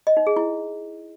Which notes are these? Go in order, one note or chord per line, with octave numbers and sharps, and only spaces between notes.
D#5
D#4
G#4
E4